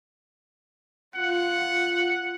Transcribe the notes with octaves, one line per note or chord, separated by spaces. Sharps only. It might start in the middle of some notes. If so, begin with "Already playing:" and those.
F4 F#5